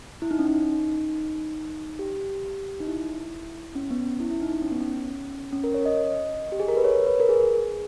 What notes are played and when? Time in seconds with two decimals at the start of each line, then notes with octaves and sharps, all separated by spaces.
0.22 E4
0.31 D#4
0.39 C#4
0.47 D#4
1.99 G4
2.80 D#4
2.87 E4
3.75 C#4
3.91 B3
4.05 C#4
4.20 E4
4.31 E4
4.42 D#4
4.53 D#4
4.62 C#4
4.71 B3
4.81 C#4
5.53 C#4
5.64 A#4
5.74 C#5
5.86 D#5
6.52 G4
6.60 G#4
6.68 A#4
6.77 B4
6.84 C#5
7.07 B4
7.20 A#4
7.29 G#4